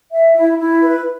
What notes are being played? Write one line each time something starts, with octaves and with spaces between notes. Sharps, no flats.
E5
E4
E4
B4